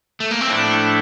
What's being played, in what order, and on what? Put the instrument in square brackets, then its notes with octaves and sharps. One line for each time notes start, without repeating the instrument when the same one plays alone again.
[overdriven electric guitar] A3
A#3
C4
[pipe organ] A2 F3 A3 E4 A4 [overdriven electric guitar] D4